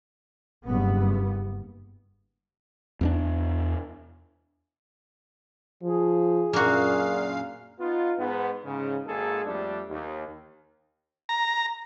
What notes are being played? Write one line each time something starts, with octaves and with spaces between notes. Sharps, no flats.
F#1 G2 B3
E2 A#3 D4
F3 G#4
F#2 A#2 A#3 D4 F#4 F5
B3 D#4 F4
G#2 B3
G#2 C#3
G#1 G#2 A#3 G#4 A4
F2 G3 A3 D4
D#2
A#5